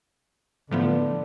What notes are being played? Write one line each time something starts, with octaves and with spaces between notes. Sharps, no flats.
A2 D3 F3 B3